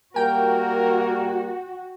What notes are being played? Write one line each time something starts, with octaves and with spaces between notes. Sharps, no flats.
G3 A#3 F#4 A#4 G5